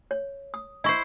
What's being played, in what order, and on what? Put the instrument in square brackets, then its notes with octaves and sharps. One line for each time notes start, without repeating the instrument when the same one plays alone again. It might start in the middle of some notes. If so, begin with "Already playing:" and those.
[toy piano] C#5
D#6
[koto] E4 C5 [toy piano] D#5 C#6